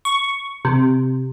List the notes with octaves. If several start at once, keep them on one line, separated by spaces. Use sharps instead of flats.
C#6
C3